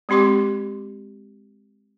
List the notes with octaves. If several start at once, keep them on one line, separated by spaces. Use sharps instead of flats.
G#3 C4 G4 C6 D6